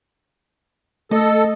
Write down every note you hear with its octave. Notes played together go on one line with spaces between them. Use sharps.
A3 A4 D#5